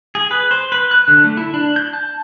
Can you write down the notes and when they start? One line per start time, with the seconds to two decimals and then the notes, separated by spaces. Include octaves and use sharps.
0.15 G#4
0.31 B4
0.51 C5
0.72 B4
0.91 F#6
1.08 D3
1.24 A3
1.37 E4
1.54 D4
1.76 G6
1.93 A5